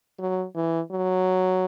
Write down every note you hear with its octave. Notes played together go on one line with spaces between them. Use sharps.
F#3
E3
F#3